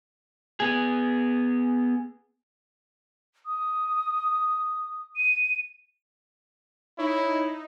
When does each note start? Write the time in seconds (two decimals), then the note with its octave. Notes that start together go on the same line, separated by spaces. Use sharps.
0.60 B3 G#4
3.46 D#6
5.16 D#7
6.98 D#4 E4 C#5